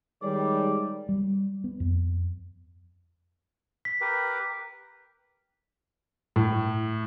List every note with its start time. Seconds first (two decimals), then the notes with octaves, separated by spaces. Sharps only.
0.22 D#3 G3 G#3 G4 G#4 C#5 D5
1.09 G3
1.64 B3
1.80 F2
3.85 B6
4.01 G4 A#4 B4
6.36 A2